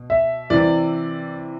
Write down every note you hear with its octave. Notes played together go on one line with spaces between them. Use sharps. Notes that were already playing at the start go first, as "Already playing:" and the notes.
Already playing: B2
E5
C3 E3 D5